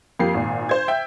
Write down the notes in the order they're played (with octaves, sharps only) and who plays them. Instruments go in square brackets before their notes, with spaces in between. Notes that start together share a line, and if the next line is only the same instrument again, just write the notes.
[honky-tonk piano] F2 A#3 G4 C7
G#1 A#2
C5 G#6
E5 G5 G6